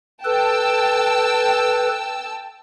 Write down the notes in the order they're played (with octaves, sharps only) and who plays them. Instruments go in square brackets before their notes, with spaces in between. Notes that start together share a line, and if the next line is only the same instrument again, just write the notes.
[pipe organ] A4 B4 [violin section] G5 A5 E6